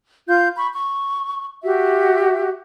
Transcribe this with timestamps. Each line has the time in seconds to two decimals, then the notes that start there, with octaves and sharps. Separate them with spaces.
0.28 F4 F5 G6
0.56 B5 C#6
0.72 C#6
1.62 F#4 G4 E5